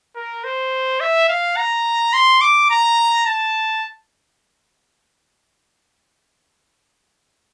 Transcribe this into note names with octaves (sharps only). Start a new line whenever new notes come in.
A#4
C5
E5
F5
A#5
C6
D6
A#5
A5